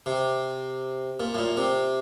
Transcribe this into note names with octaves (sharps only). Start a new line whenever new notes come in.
C3
A#2
A2
A#2
C3